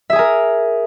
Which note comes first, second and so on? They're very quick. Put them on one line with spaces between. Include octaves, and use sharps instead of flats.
E5 G#4 G#5 A#4